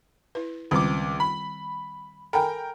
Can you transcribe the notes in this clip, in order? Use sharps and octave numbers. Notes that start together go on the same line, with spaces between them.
E4 B4
C#2 D#3 G3 C4 D6
B5
A4 A#4 G5 G#5 B5